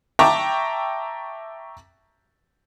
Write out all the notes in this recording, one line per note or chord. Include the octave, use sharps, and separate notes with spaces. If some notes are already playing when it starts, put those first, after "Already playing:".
E5 G5 A5 A#5 C#6 D6